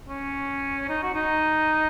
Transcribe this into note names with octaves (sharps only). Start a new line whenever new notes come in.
C#4
D#4
F#4
D#4